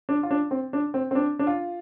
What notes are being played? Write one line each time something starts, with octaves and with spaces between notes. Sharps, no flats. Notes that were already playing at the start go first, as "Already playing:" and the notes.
D4
F4
D4
C4
D4
C4
C4
D4
D4
F4